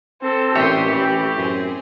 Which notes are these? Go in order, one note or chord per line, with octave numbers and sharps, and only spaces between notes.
C4 A4
A1 A#2 G4 C#5 E5 G5 C6 D#6
E3
F#2 C4 G#4